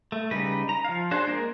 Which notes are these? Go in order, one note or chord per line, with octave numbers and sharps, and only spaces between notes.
A3
C#3 G3 D#4 B4
A#5
F3 F5
D4 F#4 G#4 C5
G#3 A#3 A#4